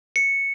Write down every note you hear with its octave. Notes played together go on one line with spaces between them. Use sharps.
C#7